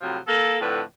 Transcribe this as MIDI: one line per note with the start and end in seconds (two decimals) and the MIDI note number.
0.01 0.17 45
0.01 0.17 48
0.01 0.17 53
0.01 0.17 54
0.26 0.56 58
0.26 0.56 69
0.60 0.81 41
0.60 0.81 45
0.60 0.81 50
0.60 0.81 71